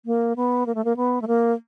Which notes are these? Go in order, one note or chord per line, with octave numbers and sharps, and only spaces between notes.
A#3
B3
A#3
A3
A#3
B3
A3
A#3